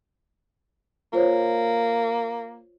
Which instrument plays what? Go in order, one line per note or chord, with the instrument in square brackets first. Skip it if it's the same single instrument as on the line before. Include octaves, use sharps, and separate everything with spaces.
[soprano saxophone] A#3 [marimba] F4 C5 C#5